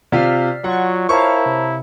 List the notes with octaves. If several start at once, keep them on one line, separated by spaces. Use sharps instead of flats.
C3 F4 D5 F6 B6 C7
F#3 F4 F#5 C#6
E4 A#4 C5 C#5 F5 A5 A#5 C#6
C3